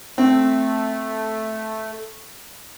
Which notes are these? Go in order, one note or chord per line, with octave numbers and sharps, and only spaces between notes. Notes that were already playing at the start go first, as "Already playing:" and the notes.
A3 C4